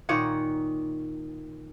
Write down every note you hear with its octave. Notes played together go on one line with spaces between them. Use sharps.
A#2 D#3 C#5 F#5